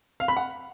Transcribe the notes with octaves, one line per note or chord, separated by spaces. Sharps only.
F5
B5
F#5